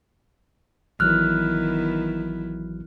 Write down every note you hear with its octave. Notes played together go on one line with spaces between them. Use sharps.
A1 D#3 E3 F#3 B3 E4 F6 F#6